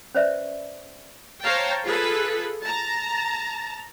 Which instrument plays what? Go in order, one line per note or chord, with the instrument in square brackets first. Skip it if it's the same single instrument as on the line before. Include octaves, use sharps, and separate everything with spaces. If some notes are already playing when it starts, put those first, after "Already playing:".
[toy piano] C#4 B4 C5 D5 E5
[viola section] C5 C#5 F5 G5 A5 A#5
F4 G#4 A4 B4
A5 A#5